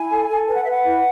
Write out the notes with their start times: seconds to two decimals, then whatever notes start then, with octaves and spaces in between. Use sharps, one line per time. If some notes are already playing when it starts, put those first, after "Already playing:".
Already playing: E4 G#5
0.11 A4
0.29 A4
0.47 B4 G#5
0.55 F#5
0.63 E5
0.66 B4 F#5
0.84 E4